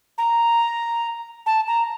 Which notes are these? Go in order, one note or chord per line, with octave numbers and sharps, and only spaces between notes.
A#5
A5
A#5